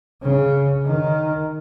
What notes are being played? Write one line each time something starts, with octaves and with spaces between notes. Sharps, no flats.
C#3
D#3